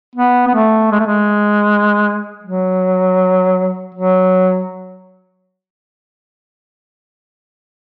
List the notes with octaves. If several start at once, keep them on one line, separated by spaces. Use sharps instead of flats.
B3
B3
A3
G#3
A3
G#3
F#3
F#3